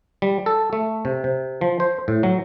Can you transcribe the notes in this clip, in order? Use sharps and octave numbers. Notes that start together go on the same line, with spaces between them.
G3
A4
A3
C3
C3
F3
C5
A2
F#3